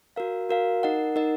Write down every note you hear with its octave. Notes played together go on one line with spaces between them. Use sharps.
F#4 A#4 F5
F#4 A#4 F5
D#4 A#4 D#5 F#5
D#4 A#4 D#5 F#5